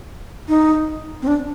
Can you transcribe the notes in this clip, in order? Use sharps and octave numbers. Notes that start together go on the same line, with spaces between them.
D#4
C4
D4